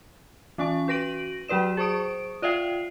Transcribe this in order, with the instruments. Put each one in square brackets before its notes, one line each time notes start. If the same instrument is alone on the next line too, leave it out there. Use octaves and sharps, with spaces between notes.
[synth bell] E3 C#4 G#5 C#6
F#4 B4 A#6 D7 D#7 F#7
F#3 F#4 B4 D5 E7
G#4 C5 C#6 D#6 D7
F4 D5 E5 F5 G5 C7